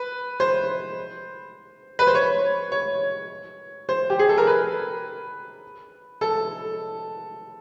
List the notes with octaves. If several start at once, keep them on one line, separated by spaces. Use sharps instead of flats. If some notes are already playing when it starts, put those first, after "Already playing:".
Already playing: B4
C5
B4
C5
C#5
C#5
C5
G4
G#4
A4
A#4
B4
A4